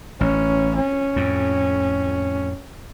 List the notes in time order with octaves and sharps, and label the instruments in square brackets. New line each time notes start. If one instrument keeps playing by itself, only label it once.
[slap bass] A1 [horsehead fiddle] C#4
[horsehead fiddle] C#4
[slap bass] F2 A2